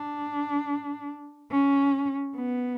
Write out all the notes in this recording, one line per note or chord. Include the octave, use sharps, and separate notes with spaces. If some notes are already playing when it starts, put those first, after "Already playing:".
Already playing: D4
C#4
B3